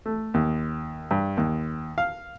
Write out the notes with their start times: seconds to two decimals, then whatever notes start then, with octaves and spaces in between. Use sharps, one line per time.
0.06 A3
0.34 D#2
1.11 G2
1.37 D#2
1.98 F5